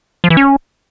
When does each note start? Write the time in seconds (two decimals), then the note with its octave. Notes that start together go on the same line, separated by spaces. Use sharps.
0.24 F3
0.30 E3
0.37 C#4